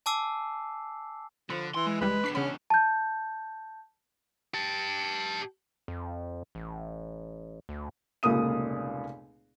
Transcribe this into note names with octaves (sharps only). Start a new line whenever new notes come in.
G#5 A5 D6 E6 C7
D3 F3 B5
E3 C6
G#3
C#2 E3 G3 B4
E2 D4 C#6 B6 C7
C#3 C#4 F#5 B5
A5 G6
G4 A5
F2
A1
D2
F1 C#2 A#2 A#3 D#6 D#7